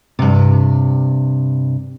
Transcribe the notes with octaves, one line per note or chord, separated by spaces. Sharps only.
G2 C3